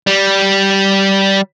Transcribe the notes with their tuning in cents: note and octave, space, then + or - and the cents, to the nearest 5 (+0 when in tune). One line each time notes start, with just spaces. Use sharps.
G3 -10